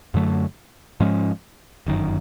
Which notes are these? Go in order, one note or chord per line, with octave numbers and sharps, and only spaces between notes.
F#2 D3 F#3 A3
G#2 F3 G#3 C#4
G1 F#2 D#3